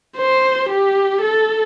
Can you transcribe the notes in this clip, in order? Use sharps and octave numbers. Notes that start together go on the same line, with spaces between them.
C5
G4
A4